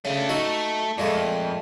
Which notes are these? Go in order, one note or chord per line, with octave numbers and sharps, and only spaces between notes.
C#3 A3 D4
A3 D#4 F#4 A4
F2 A#2 G#3 A3